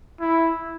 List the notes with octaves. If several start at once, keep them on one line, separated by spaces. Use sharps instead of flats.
E4